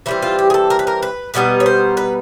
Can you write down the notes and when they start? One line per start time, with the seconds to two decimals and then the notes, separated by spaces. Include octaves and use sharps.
0.06 E3 G3 C4 E4
0.22 F4
0.39 G4
0.50 G#4
0.54 A4
0.70 A#4
0.79 B4
0.87 A#4
1.03 B4
1.34 B2 G3 B3 D#4 B4
1.60 C#5
1.66 C5
1.97 B4